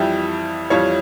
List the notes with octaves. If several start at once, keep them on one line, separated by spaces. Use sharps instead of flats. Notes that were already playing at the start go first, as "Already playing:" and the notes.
Already playing: F2 E3 G3 E5 G5
F2 E3 G3 C#5 F5